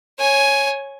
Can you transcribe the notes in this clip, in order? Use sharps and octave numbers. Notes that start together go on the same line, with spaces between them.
C#5 G#5